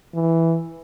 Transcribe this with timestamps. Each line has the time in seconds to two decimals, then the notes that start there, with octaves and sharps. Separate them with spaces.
0.14 E3